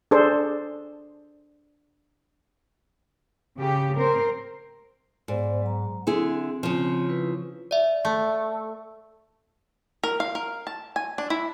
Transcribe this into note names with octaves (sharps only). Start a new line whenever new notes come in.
D4 G#4 A4 C5
C#3 G4
C4 A#4 C5
G#2 B3 C5 D5
F#3 A#5
D3 C4 E4 G#4
C#3 F3 C4 C#5
E4 B4
D5 E5
A3
A#4
F5
A#4
A5
G#5
D4
E4